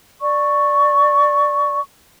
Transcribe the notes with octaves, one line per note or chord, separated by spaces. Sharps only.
D5 C#6